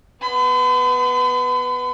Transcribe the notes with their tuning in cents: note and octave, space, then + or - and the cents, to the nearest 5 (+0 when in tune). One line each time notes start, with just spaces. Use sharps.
B3 +0 B5 +45